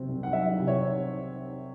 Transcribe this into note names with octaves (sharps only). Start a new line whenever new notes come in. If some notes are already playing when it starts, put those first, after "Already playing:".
Already playing: C3 F#3 C4
C2
F#5
F#3 E5
C3
C#5
C4